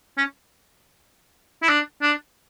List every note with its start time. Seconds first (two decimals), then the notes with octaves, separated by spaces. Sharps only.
0.18 C#4
1.63 E4
1.69 D4
2.02 D4